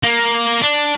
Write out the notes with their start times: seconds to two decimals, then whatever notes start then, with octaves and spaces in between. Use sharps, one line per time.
0.03 A#3
0.62 D4